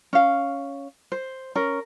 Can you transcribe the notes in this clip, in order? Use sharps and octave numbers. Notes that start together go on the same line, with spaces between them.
C#4 F5
C5
C#4 A#4